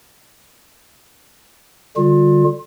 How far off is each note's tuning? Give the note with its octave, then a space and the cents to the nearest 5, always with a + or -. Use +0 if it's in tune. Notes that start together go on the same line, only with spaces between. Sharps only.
D3 +0 G3 +0 F4 +30